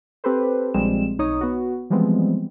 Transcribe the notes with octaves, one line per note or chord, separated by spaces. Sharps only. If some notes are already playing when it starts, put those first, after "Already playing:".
C4 G4 A4 B4 C5
A#1 F3 G3 G#3 C4 E7
B1 D#4 C#5 D#6
B3 F#4
E3 F3 G3 G#3 B3 C4